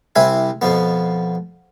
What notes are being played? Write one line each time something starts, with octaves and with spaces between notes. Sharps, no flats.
C2 C3 C4 E4 E5 G#5
F2 B2 F3 B3